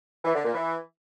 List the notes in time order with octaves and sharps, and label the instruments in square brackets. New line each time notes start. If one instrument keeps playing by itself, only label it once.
[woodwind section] E3
D3
A#2
E3